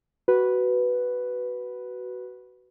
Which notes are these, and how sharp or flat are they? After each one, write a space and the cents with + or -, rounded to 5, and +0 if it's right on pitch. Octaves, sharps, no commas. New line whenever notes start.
F#4 +20 B4 +0